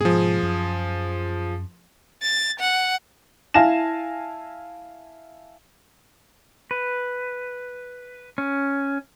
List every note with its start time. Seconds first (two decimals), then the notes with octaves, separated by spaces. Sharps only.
0.01 G#2 B2 F3 G#4
0.43 F#2
2.23 A6
2.59 F#5
3.54 E4 F5 G#5 A5 A#6 E7
6.71 B4
8.38 C#4